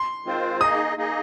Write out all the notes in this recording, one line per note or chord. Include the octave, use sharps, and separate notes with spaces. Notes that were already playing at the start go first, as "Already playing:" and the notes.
Already playing: C6
D#3 G#3 C4 F4 C5
A#3 D#4 G#4 D#5 D#6
A#3 D#4 G#4 D#5